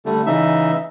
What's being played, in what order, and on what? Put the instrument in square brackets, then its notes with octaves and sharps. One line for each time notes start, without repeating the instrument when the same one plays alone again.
[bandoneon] D3 G3 A3
C#3 E3 D#4 E5